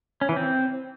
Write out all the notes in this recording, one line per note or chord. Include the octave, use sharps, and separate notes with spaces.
C#4
E3
C4